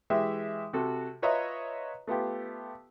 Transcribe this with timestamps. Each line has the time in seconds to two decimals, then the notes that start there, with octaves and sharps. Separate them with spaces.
0.10 E3 G#3 G4 E5
0.73 C3 F#4 A4
1.22 F4 B4 C#5 D#5 E5 A#5
2.07 A3 B3 F4 G4